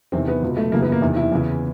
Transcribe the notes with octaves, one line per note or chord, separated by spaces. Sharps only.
E2 C3 D#3 C4
B3
C#2 B2
A3
F#2 C#3 E3 A#3
B3
A#3
E2 C3 D#3
E4
E2 C#3 E3